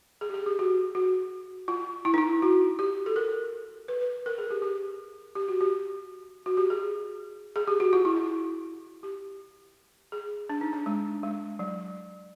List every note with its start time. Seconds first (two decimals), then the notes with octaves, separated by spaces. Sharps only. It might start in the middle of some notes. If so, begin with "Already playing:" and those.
0.21 G#4
0.29 G4
0.34 G#4
0.46 G4
0.59 F#4
0.95 F#4
1.68 F4
2.05 E4
2.14 D#4
2.18 E4
2.42 F#4
2.79 G4
3.06 A4
3.16 A#4
3.88 B4
4.01 B4
4.26 A#4
4.38 G#4
4.51 G4
4.62 G4
5.35 G4
5.48 F#4
5.61 G4
6.46 F#4
6.57 G4
6.70 G#4
7.56 G#4
7.68 G4
7.80 F#4
7.93 F4
8.05 E4
8.17 F4
9.03 G4
10.12 G#4
10.49 D4
10.61 D#4
10.73 D4
10.86 G#3
11.23 G#3
11.59 F#3